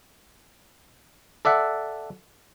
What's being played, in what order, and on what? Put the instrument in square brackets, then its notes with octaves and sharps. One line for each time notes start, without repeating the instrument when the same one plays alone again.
[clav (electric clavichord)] A4 D5 E5 F#5